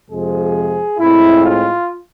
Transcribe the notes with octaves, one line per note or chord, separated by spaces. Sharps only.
F2 C3 F3 G#3 G#4
A2 G#3 C4 E4
F4